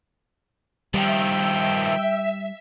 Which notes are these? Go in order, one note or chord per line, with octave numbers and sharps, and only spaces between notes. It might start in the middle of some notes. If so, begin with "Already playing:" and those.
D#3 F3 G3 E5 G5